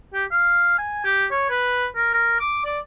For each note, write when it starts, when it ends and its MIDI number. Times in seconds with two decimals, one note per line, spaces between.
0.14 0.24 67
0.31 0.74 77
0.78 1.05 80
1.05 1.25 67
1.31 1.46 73
1.50 1.86 71
1.96 2.10 70
2.13 2.35 70
2.40 2.65 86
2.65 2.79 74